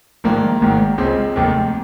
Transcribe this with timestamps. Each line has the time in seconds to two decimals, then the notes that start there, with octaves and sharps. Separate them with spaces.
0.24 A#1 G#2 D#3 A#3
0.61 G#1 G#2 D#3
0.98 C#2 C#3 G#3 C4
1.36 F1 D#2 D#3